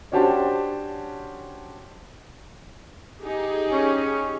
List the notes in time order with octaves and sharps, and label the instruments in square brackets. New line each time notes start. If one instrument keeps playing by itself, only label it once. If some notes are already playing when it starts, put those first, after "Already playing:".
[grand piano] C#4 D4 F#4 G4 C5 A5
[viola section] D#4 G4 G#4
[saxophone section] C#4